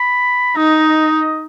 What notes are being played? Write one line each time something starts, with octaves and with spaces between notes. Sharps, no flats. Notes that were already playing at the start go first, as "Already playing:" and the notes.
Already playing: B5
D#4 D#5